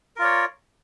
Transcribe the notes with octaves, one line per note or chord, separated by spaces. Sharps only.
F4 A#4 C#5 D5